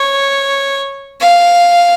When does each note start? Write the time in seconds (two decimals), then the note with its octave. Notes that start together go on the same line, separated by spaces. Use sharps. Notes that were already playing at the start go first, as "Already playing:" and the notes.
Already playing: C#5
1.21 F5